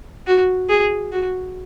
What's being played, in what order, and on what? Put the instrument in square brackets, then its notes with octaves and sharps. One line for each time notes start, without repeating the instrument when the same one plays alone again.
[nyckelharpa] F#4
G#4
F#4